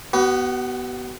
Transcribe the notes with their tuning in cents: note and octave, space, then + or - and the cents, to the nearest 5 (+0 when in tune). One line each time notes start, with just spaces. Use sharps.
B3 +0 F#4 +45